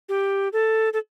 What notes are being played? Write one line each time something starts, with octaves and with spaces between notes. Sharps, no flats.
G4
A4
A4